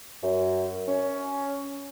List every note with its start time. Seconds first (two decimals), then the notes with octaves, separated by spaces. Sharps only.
0.23 F#2
0.87 C#4